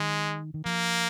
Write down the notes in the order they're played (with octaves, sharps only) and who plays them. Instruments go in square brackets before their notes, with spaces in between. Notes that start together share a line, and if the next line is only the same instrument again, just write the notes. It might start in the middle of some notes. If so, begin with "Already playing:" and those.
Already playing: [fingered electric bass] D#3 [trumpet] G#3
[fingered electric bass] D#3
[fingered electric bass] F3 [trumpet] A#3